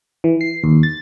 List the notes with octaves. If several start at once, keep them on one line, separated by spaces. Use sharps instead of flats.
E3
C7
D#2
A6